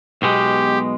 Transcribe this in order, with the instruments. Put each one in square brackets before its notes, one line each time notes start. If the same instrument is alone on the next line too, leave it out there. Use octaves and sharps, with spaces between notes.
[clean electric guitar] B1 B2 G#3 [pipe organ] G4